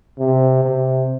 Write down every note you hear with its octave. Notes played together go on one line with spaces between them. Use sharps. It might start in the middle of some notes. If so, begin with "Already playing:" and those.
C3
C3